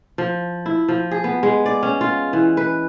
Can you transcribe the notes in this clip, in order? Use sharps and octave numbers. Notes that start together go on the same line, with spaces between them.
F3
E4
F3
G#4
B3
G#3
D5
C#4
F4
E3
B4